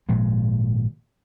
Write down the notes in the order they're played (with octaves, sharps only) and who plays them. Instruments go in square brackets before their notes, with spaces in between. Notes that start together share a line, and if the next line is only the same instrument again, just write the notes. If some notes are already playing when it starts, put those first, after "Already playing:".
[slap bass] G#1 A#2 F3 G#3